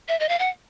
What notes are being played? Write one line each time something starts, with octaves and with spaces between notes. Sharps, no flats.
E5
D#5
F5
F#5